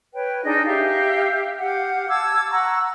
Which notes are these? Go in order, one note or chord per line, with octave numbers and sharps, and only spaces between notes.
B4 C#5 G5
D4 D#4 G#4 D#5
G4 E5 F5
G4 F5 F#5
A5 D6 E6 G#6
F#5 A#5 C#6 E6